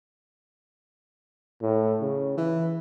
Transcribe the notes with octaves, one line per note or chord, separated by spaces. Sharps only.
A2
C#3
E3 B4